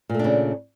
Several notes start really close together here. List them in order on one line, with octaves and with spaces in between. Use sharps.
A#2 A3 D4 C#3